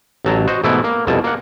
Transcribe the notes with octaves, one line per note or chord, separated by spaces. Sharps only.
A1 F#3 A5 A#5
F#4 C5 D#5
G#2 B2 E3 A3 B3 E4
A#3
C2 F2 B2 G#5 A5
A#3 F#5